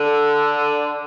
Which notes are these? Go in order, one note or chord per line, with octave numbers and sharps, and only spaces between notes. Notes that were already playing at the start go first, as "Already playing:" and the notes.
Already playing: D3